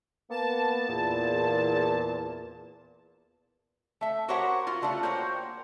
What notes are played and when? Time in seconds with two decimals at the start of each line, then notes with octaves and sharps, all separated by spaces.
0.31 A#3 B3 A5
0.88 E2 A#2
4.01 A3 E5
4.28 F#4 G4 A#4 C5 C#5 F#5
4.67 F4 F#4
4.82 G3 A3 D4 F4 F#4
5.03 A#3 F#4 A#4 C5 C#5 G5